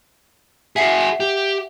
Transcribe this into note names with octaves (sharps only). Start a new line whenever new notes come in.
F#4 G#4 E5 F#5 C7
G4